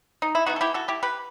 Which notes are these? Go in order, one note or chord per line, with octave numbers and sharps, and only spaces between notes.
D#4
E4
E3 G3 B3 D#4 F#4
A4
E4 G4
F#4 A4
E4 G4
G4 B4